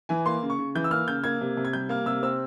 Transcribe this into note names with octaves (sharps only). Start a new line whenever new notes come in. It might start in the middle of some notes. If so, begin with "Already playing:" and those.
E3 G#5
A#3 C6
C#3
C#6
C#3
E3 G6
E6
A#3 F6
C#3 G6
A#3 G#6
C3
C3
G#6
G3 G6
A#3 F6
C3 E6
C4 E6